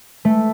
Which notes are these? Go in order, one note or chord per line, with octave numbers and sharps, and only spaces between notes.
A3